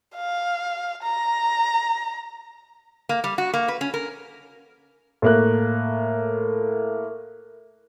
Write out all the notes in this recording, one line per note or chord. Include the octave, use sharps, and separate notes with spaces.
F5
A#5
A#3
G3
F#4
A#3
B4
C#4
A#4
A2 A#3 F#6